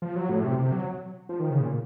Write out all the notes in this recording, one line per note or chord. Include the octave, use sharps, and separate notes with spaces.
F3
F#3
A2
C3
C3
F#3
F3
D#3
C#3
A#2